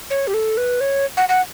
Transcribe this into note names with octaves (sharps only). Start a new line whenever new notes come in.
C#5
G4
A4
B4
C#5
F#5
F#5